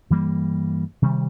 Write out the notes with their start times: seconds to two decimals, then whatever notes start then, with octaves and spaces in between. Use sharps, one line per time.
0.10 G2 E3 G3 A#3
1.02 C3 D#3 G3